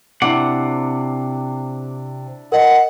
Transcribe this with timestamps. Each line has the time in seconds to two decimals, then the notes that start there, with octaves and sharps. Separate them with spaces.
0.22 C3 D4 E4 F#5 D6
2.52 A#4 D#5 F#5